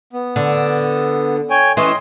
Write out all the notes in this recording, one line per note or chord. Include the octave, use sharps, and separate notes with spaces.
B3
D3
C#5 G5 G#5
E3 C#4 D#5 C6